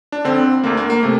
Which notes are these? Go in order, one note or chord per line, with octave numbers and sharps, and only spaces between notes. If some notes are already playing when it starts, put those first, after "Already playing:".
D4
F2 D3 C4
D2 D3 A#3
A#3
A#3
C3 A3